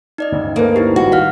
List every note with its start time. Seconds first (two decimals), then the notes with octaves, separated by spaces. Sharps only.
0.18 D#4 D5 D#5
0.32 D2 G2 C#3
0.56 A#3 A4 B4 C5
0.76 D#4 E4 G4
0.96 G#1 D2 G3 F#4
1.12 F5 F#5 F6